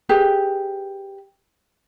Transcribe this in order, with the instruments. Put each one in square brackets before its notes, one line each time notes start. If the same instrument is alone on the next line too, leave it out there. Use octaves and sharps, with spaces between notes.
[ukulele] G4 G#4 B4